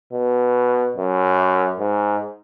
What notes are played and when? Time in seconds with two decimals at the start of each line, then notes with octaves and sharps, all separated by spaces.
0.13 B2
0.97 F#2
1.80 G#2